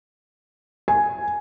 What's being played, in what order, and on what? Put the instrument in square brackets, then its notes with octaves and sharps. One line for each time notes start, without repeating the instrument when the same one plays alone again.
[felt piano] G#5